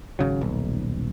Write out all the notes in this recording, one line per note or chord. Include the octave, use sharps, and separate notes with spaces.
G#1 C#3 F#3
D#1 B1